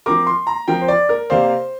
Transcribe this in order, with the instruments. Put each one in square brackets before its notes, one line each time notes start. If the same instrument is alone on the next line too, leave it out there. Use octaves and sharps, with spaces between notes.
[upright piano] F3 C4 A#4 [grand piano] D6
[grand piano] C6
A#5
[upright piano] F3 C4 A#4 [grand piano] G5
[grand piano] C5
D5
A#4
[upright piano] C3 A#3 G4 D5 F5 [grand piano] C5